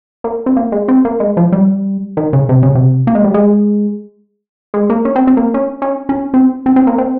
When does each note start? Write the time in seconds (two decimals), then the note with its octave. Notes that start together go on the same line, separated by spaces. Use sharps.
0.24 A#3
0.46 C4
0.57 A#3
0.72 G#3
0.88 C4
1.05 A#3
1.20 G#3
1.37 F3
1.52 G3
2.17 D#3
2.33 C#3
2.49 C3
2.63 C#3
2.75 C3
3.07 A#3
3.15 G#3
3.24 G3
3.34 G#3
4.74 G#3
4.90 A#3
5.05 C#4
5.16 C4
5.27 C4
5.37 A#3
5.54 C#4
5.82 C#4
6.09 C#4
6.34 C4
6.66 C4
6.76 C4
6.87 A#3
6.98 C4